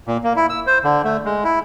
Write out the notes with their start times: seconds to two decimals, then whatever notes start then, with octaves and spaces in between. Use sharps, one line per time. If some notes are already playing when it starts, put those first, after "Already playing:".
0.07 A#2
0.24 A#3
0.36 E4
0.50 E6
0.67 C5
0.84 D3
1.05 A3
1.25 G#3
1.44 E4